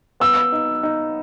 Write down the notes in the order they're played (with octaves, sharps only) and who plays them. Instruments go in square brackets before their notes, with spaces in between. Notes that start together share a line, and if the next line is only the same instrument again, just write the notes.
[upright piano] B3 [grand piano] E6
[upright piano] D#4
D#4